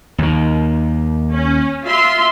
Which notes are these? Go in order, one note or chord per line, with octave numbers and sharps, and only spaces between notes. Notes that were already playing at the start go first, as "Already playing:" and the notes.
D#2 D#3
C#4
F4 E5 C6